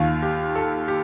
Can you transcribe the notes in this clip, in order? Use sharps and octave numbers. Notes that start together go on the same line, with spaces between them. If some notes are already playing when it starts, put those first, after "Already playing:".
Already playing: D#2 D#3 F4
G4
A4
G4